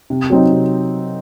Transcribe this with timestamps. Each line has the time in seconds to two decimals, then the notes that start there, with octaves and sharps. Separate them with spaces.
0.10 C3
0.30 F#3 C4 D#4
0.51 C3